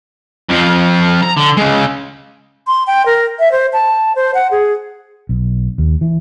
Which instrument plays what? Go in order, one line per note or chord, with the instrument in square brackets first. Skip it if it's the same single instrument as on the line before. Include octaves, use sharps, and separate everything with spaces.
[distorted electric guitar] F2 F3
A#5
D3
C#3 G#3
[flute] C6
G5
A#4
E5
C5
A5
C5
F#5
G#4
[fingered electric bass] B1
D#2
E3